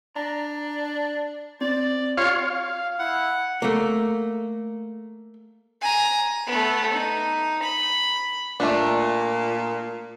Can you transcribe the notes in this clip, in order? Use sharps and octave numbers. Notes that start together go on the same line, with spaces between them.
D4 A#5
C4 D5
F4 G4 C#5 F5
F5
E4 F#5
A3 A#3
G#5 A#5
A3 B3
D#4
B5
A#2 A3 D4